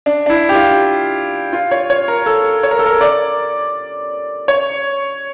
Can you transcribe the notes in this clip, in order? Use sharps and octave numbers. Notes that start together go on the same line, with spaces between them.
D4
D4
E4
G4
F4
F4
C#5
C#5
A#4
A4
C#5
A#4
A4
A#4
D5
C#5